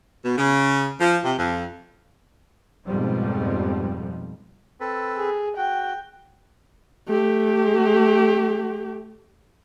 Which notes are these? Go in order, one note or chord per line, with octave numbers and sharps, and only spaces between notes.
B2
C#3
F3
C3
F2
F2 G#2 B2 F3 G3
C4 A4 B4
G#4
F#4 G5
A3 G4